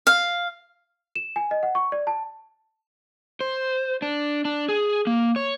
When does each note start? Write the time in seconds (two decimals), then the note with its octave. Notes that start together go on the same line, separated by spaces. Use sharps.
0.07 F5
1.16 E7
1.36 G#5
1.51 D#5
1.63 F#5
1.75 C#6
1.92 D5
2.07 A5
3.41 C5
4.02 D4
4.45 D4
4.69 G#4
5.07 A#3
5.36 C#5